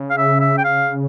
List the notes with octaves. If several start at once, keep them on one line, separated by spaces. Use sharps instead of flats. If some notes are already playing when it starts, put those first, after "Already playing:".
Already playing: C#3
F5
E5
E5
G5
F5